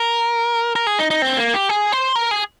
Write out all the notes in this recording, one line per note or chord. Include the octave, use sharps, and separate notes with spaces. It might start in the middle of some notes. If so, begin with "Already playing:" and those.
Already playing: A#4
A#4
G#4
D#4
D#4
C4
A#3
G4
G#4
C5
A#4
G#4